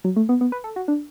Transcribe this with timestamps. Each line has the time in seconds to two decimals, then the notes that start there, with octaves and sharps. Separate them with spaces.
0.04 F#3
0.16 A3
0.29 B3
0.41 B3
0.52 B4
0.64 A4
0.76 F#4
0.88 D4